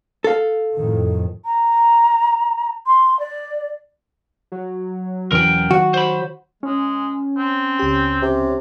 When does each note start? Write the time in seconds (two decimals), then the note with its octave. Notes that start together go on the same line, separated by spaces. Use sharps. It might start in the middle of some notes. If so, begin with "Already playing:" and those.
0.24 A4 F5
0.76 F2 A2 D#3
1.45 A#5
2.87 C6
3.20 D5
4.52 F#3
5.32 E1 E3 C#4 A#4 G5
5.71 D#3 F#4
5.94 C5 B5
6.63 G#3 C#4
7.38 C4
7.79 C#2 G4
8.22 C3